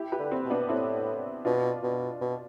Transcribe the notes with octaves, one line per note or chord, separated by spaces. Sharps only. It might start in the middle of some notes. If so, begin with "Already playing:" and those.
Already playing: E4 G4
G4 B4
D3
C4
B2
B3 D4
A2 C4 E4
B2 D4 F4
B2
B2